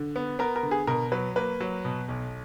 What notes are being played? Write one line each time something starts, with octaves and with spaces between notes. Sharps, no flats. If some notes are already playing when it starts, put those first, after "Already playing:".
Already playing: D3
B3
B3 A#4
A#4
D3
G#4
B2 A#4
F#3 B4
A#3 B4
F#3
B2
B1